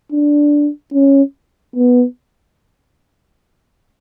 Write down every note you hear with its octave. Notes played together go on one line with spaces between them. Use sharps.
D4
C#4
B3